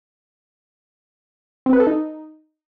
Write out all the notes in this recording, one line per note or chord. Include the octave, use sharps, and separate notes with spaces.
C4
B4
A4
D#4